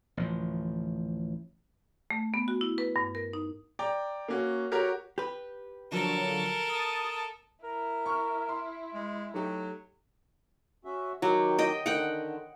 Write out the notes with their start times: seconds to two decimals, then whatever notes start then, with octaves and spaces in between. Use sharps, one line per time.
0.17 A1 D2 F3
2.11 A3
2.34 B3
2.48 F#4
2.61 E4
2.78 B4
2.96 G2
3.15 A#4
3.33 D#4
3.79 D5 G5 A#5
4.28 A#3 C#4 F#4
4.72 F#4 G4 A#4 C#5 A#5
5.18 G4 B4
5.91 D3 F3 F#3 A4 A#4
6.69 A5 D#6
7.64 E4 A#4
8.06 C#6 F6
8.49 C6
8.94 G#3
9.34 F#3 A3 D#4 G4
10.85 C#4 F#4 E5
11.22 D#3 F#3 G4
11.59 D#5 G5
11.86 D3 D#3 F#5 G5